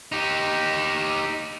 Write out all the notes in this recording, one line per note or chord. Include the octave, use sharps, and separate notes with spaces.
D#4 G4